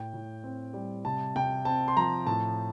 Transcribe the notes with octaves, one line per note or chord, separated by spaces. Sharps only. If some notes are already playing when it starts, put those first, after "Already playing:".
Already playing: A2 G5
A2
C4
G3
C3 A5
C3 G5
C4 A5
C6
F3 A#5
A2 A5